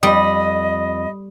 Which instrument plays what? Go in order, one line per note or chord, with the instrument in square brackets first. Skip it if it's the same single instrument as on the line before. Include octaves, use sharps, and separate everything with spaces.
[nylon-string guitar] F2 [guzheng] G3 [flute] D#5 [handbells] B5 D#6